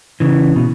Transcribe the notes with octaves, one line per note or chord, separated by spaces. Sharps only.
C#3 E3
B2